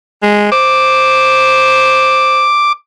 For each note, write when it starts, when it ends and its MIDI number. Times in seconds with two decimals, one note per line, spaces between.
0.23 0.49 56
0.52 2.48 72
0.52 2.72 86